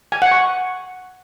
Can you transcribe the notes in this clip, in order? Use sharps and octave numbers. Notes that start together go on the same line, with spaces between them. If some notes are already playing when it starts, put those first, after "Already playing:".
G#5
F#5
C#6